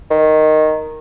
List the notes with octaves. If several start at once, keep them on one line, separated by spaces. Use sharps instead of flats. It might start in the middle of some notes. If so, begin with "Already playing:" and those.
D#3